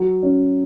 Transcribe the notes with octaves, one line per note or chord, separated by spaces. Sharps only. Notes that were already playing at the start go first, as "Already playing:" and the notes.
Already playing: F#3
C#4